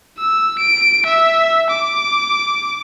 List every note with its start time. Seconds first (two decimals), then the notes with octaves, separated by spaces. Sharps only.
0.18 E6
0.59 D7
1.06 E5
1.70 D6